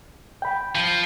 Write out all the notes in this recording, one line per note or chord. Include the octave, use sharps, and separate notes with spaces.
G5 B5
F3